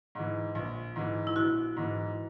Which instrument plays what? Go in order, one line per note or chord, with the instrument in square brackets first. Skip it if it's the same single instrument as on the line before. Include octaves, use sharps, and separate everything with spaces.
[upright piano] G#2 E3
A#1
G#2 E3
[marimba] E4
[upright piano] A#1 [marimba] F#4
[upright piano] G#2 E3